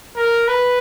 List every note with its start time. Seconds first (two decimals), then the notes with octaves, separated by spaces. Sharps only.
0.16 A#4
0.48 B4